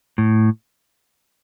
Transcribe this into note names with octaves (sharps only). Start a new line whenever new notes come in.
A2